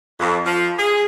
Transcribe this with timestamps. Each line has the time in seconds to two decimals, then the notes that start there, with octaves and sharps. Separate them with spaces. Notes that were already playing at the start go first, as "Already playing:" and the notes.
0.19 F2
0.45 F3
0.77 G#4